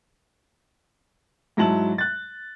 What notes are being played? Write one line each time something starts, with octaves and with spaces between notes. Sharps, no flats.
G#2 F#3 E4 A5 F#7
F#6 A6